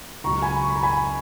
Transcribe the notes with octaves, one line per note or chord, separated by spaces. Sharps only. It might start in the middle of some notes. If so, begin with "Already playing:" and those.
C#2 C#3 F#3 A#5 C#6
G#5 B5
C#6
B5
A#5
G#5 B5